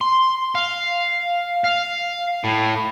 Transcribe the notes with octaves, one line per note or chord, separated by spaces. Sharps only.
C6
F5
F5
A2